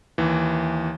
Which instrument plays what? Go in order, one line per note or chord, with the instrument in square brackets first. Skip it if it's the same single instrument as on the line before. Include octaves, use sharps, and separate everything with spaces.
[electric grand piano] D#2 E3